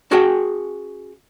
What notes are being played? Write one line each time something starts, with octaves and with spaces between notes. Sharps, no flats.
C#4 F#4 G#4 F#5 G5 A5